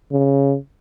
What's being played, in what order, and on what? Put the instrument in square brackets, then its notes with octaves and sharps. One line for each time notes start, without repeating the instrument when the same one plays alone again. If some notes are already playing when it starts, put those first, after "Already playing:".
[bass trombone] C#3